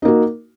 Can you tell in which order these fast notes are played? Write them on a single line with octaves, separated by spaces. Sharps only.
D#4 A#3 F#4